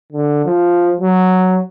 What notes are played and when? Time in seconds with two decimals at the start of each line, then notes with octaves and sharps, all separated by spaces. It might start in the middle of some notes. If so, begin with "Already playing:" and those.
0.12 D3
0.46 F3
1.01 F#3